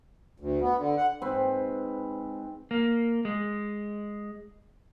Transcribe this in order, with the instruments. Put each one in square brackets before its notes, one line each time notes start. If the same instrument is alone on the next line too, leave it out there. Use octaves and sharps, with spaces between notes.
[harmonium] D2
B3
D3
F#5
[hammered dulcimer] G#2 C4 B4
[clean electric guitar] A#3
G#3